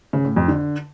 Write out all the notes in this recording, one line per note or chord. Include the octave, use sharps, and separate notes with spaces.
C#3
A2
F2
D3